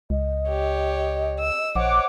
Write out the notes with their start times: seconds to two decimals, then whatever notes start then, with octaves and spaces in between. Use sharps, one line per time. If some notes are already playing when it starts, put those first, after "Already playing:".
0.10 C#2 D#5
0.48 G4 C#5
1.40 E6
1.76 A#1 C5 C#5 F#5 D6